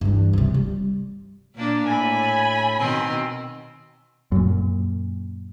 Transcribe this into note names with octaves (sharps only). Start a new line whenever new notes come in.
G2 E3
C3 F3
G3
A#2 A#3 D4
A2 G#5 B5
B2 D#3 C4
F#2 A#2